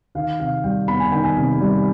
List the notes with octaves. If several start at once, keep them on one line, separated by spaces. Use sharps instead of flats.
D#3 F5
C3 F5
G3 G5
B3 B5
G#5
D#3 G5
G#5
C3
G3